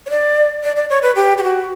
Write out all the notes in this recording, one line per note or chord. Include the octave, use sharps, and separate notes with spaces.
C#5
D5
D5
D5
C#5
B4
G4
G4
F#4